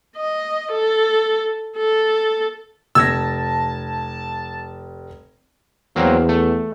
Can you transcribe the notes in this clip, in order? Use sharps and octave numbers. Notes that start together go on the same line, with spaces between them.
D#5
A4
A4
F1 A5 E6 G#6 A#6
E2 F#3 A#3 C4
A3